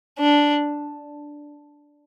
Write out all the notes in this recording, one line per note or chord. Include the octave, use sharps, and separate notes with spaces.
D4